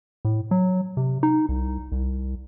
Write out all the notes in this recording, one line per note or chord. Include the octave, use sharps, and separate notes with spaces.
A2
F#3
C3
D#4
C2
C2